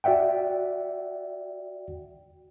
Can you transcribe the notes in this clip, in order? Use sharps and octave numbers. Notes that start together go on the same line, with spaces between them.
F#4 D5 E5 F#5 G5